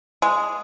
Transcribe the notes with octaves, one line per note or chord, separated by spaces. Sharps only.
G#3